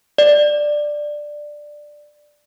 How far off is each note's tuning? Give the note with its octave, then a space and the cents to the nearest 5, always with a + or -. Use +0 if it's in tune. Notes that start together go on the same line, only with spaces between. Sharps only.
D5 +10